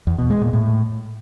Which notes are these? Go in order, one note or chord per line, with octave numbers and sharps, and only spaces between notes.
E2
B2
G#3
A#2
A2